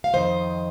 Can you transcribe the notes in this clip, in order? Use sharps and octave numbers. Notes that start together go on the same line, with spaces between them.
F5
F2 D#3 C5 D#5